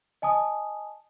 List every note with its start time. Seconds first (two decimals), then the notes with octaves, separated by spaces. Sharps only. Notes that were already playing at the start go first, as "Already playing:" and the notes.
0.22 D#5 G#5 A5 D#6